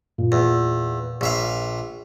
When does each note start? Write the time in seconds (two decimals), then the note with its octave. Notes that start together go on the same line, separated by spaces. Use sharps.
0.18 A#2
0.32 E2
1.21 A#1 E5 F5